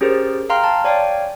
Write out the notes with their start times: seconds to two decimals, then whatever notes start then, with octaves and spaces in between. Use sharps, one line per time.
0.01 C#4 G4 G#4 A#4 C5
0.50 F5 G5 A#5 C6 F6
0.63 A5 C6
0.84 C#5 D5 F5 G5 G#5